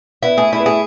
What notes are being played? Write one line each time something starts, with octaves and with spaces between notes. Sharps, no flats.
B3 E4
A3 G#4
A3 E4
B3
A3 G#4